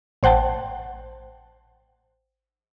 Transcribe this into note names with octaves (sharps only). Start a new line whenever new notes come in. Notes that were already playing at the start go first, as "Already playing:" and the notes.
A1 C5 F#5 G5 A5